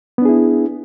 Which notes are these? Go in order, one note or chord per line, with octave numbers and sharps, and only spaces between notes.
B3 D4 E4 G#4